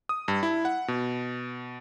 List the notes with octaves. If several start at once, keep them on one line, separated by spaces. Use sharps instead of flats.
D#6
G2
E4
F#5
B2